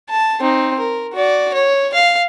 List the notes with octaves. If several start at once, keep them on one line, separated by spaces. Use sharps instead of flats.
A5
C4 D#4
A#4
F#4 D5
C#5
F5